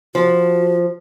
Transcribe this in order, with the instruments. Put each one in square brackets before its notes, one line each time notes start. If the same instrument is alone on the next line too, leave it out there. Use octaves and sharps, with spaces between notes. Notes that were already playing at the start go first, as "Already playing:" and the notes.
[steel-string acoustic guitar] F3 [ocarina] F#4